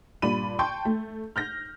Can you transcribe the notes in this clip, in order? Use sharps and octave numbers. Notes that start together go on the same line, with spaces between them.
G2 A#2 D5 B5 D#7
G5 A5 C6 C#6 G6
A3
F6 G6 A#6